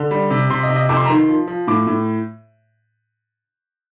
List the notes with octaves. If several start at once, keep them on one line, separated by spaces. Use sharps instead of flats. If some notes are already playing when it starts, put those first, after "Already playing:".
Already playing: D3
G3
C3
C3 C6
D#5
C3
D#5
F2 D6
C6
A#5
D#3 C6
F3
F3
A2 D6
A2